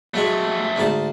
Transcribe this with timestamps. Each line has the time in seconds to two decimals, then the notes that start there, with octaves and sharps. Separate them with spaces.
0.14 C3 F#3 G#3 A3 F#4
0.76 D2 G#2 A5